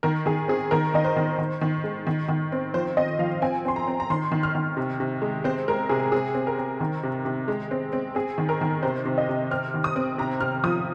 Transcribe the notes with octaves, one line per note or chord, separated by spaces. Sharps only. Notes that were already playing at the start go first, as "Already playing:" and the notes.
D#3 A#4
D#3 G#4
C4 G#4
D#3 A#4
D#3 D#5
C5
D#3
D#3
D#3
G#3
D#3
D#3
C4
F3 C5
C4 D#5
F3 F5
C4 G#5
C4 C6
A#5
C4
A#5
D#3 C6
D#3
F6
D#3
C3
C3
G#3
C4 C5
G#3 A#4
C3 G#4
C4 G#4
C4
A#4
C4
D#3
C3
C3
G#3
C4
C4
C4 G#4
D#3
A#4
D#3
C3 C5
C3
D#5
C3
C4 F6
D#3
D#6
C4
C3 A#5
C3 F6
F3 D#6